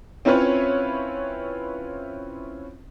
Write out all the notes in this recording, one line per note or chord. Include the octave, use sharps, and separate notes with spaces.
C4 C#4 E4 F4 B4 C#5